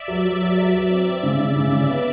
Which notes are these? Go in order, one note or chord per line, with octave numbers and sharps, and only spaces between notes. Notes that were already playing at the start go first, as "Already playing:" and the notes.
Already playing: D5 E5
F#3
F#3
F#3
F#3
F#3
C4 D5 E5
C4
C#3
C#3
C#3
C#3
B3